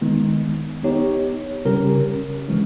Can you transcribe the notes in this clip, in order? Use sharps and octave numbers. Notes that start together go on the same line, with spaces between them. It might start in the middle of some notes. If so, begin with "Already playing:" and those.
D#3 G#3 B3 D#4
B3 D#4 G4 C#5
C#3 G3 C#4 G4 A#4
E3 G#3 C#4